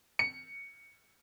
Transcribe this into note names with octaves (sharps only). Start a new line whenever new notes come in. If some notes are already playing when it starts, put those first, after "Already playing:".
C#7